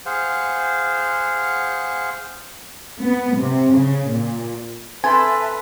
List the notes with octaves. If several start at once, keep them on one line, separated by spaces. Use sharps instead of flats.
G#4 C5 F5 F#5
B3
C3
C#3
A#2
C4 A4 B4 E5 G#5 A5